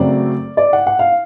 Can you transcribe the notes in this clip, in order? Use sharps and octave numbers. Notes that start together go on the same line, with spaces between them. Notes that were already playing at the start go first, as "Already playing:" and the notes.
Already playing: F#2 C#3 F#3 A3 C4 D5
D5
F#5
F#5
F5